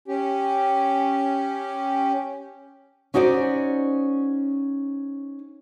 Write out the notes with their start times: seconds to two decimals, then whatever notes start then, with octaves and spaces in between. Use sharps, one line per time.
0.08 C#4 G4
3.14 C#4 D#4 F#4 C5 D5